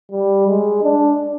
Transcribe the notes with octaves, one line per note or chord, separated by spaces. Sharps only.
G3
G#3
D4